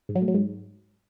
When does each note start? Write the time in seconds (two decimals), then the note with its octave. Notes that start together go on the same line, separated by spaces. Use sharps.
0.09 G#2
0.15 F#3
0.22 A2
0.28 F#3
0.34 G#2